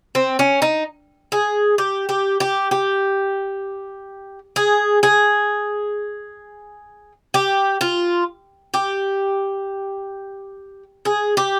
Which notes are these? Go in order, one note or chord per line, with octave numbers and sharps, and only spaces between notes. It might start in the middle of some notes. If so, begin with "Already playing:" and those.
C4
C#4
D#4
G#4
G4
G4
G4
G4
G#4
G#4
G4
F4
G4
G#4
G4